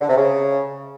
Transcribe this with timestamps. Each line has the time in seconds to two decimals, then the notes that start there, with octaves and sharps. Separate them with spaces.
0.01 D3
0.09 C3
0.17 C#3